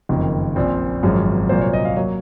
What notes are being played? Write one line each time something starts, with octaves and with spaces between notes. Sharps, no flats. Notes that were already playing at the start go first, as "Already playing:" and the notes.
F#1 F2 D#3
A#1 A#2 F3 C4
G#1 F#2 F3 G#3 C#4
C2 A#2 F#3 A#3 C5
C#5
D#5
F5
F#3 A#3 C#5